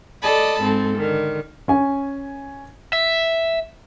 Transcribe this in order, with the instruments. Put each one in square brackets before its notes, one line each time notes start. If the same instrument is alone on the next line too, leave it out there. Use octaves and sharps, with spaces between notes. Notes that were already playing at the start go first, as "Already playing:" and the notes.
[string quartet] A4 D5 D#5 A5 B5
G#2 C4 A4
D3 D#3
[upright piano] C#4 G#5
[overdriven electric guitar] E5